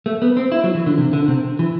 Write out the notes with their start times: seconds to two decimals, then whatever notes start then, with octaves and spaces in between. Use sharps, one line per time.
0.06 A3
0.22 B3
0.37 C4
0.52 E4
0.64 F#3
0.75 E3
0.86 D3
0.98 C3
1.13 D3
1.28 C3
1.59 E3